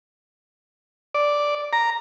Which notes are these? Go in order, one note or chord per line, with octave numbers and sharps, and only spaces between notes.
D5
A#5